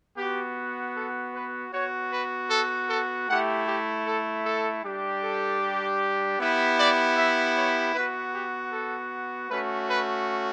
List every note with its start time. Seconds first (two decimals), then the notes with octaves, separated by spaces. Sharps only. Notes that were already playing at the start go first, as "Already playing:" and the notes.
0.17 B3 F#4 G4
0.95 A4
1.34 B4
1.73 B3 F#4 C#5
2.11 B4
2.50 A4
2.89 A4
3.28 A3 E4 G4 F#5
3.67 G4
4.05 A4
4.45 A4
4.83 G3 D4 G4
5.23 A4
6.39 B3 E4 G4 B4
6.78 D5
7.16 E5
7.55 C#5
7.94 B3 F#4 B4
8.33 G4
8.72 A4
9.49 A3 C#4 F#4 B4
9.88 B4